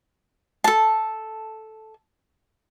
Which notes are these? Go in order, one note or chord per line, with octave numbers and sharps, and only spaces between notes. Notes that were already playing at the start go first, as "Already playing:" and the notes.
A4 A5